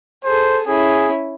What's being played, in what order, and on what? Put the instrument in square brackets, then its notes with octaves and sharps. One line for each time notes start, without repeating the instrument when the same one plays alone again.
[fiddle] G#4 A4 [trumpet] C5
[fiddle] C#4 E4 [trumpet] G#4